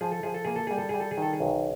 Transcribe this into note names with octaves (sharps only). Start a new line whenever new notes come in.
F3 G#4
A4
F3 G#4
A4
A#3 G#4
A4
G3 G#4
A4
G3 G#4
A4
G#4
D#3 A4
G#4
B1